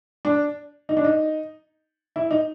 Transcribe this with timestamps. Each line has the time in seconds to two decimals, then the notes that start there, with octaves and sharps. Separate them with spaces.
0.25 D4
0.89 D#4
0.97 D4
1.04 D#4
2.16 E4
2.31 D#4